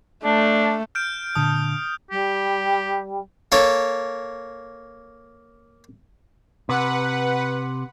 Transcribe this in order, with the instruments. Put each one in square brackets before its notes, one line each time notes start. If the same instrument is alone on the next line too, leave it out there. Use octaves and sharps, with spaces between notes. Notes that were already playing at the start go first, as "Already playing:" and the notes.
[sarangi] A3 [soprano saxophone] D4
[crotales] F6 G6 D7
[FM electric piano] A#2 D3 A5 [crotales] D#6
[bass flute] G3 [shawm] G4
[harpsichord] A#3 A4 C#5
[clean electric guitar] C3 [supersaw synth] B4 F#5